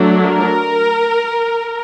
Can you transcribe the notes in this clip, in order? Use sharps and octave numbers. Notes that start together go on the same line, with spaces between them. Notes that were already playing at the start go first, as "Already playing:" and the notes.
Already playing: F#3 A3 D4
A#4